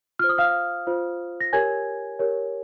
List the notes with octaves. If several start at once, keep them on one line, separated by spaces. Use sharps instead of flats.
F4 C5 F6
D#6
F5 F6
F4 C5
A#6
G4 A#4 C#5 G#5 G#6
G4 A#4 C#5